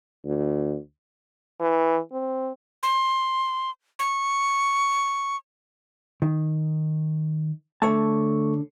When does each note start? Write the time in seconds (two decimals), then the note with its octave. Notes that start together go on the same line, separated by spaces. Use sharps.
0.25 D2
1.60 E3
2.12 C4
2.83 C6
3.99 C#6
6.22 D#3
7.82 D3 A3 A4 C#5 A5 C#6